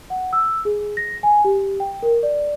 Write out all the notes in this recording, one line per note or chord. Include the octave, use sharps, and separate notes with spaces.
F#5
E6
G#4
A#6
G#5
G4
G5
A#4
D5